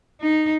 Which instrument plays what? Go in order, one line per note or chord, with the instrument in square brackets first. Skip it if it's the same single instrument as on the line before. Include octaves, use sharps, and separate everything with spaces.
[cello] D#4